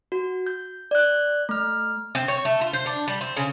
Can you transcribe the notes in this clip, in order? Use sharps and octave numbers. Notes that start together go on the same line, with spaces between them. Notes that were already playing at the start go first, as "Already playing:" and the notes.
F#4
G6
D5 F#6
A3 F6
C4
C#5
A3
F4
C5
D4
G3
C4
C#3